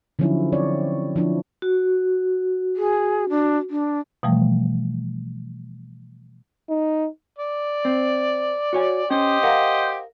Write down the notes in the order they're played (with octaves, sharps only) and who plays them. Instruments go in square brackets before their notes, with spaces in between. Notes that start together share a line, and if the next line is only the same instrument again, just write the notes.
[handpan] D3 F3 F#3 C#4 D#4 E4
C4 C#5 D5
F3 D4 E4
[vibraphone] F#4
[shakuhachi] G#4
D4
D4
[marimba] B2 E3 F3 G3 A3
[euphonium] D#4
[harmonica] D5
[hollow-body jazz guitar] C4
F#4 C#5 G#5
[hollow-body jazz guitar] C#4 [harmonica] G4 C5 D#5
[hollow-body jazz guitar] A#4 F5 F#5